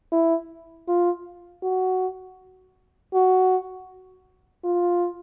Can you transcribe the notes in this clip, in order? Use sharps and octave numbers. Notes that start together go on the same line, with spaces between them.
E4
F4
F#4
F#4
F4